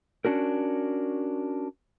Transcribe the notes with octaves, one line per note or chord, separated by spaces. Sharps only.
C#4 D4 F#4 A#4